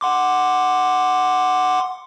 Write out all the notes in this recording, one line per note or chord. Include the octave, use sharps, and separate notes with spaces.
F#5 C6 D6